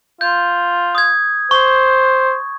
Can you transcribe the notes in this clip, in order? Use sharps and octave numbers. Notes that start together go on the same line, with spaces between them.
F4 G6
D#6 G#6
C5 C#6